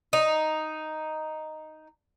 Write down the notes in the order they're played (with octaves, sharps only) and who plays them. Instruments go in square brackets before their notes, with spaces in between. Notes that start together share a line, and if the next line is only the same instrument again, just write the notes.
[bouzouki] D#4